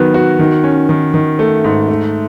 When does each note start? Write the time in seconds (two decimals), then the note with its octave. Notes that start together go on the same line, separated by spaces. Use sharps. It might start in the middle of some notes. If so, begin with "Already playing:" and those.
Already playing: D#3 F#3 B3
0.14 F#4
0.39 D#3
0.64 C#4
0.89 D#3
1.14 D#3
1.39 A3
1.64 G#2
1.89 A3